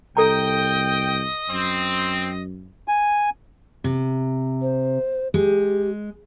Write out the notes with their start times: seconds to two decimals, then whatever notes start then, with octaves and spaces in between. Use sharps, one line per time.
0.17 C2 A4 D#5 G5 A#5
1.49 F#2 C4
2.88 G#5
3.84 C3
4.62 C5
5.34 G#3 G4